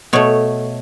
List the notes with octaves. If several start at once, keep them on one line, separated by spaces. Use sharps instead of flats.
B2 A3 C#5